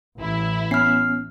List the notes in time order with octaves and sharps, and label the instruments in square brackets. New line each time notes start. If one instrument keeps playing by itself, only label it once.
[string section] A1 E4 B5
[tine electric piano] B3 C#4 [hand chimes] F6 C7